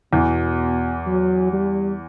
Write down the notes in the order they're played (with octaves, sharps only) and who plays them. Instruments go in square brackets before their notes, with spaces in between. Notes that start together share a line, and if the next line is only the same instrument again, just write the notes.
[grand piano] E2 E3 [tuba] B2
[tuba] F#3
G3